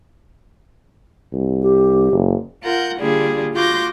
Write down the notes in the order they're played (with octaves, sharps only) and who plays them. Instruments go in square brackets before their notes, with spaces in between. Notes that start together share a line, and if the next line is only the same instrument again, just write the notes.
[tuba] C2
[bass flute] G4
[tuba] F#1
[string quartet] F4 A#4 F#5 G6
D3 G3 A#3 D4 F4 G#4
F4 F#4 C6 D6 G6 A#6